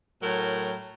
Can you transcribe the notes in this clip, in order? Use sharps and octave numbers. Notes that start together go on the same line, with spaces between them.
A2 F#3 A#4